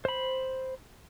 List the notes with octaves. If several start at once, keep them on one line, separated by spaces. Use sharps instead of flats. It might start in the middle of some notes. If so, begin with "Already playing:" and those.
C5 B5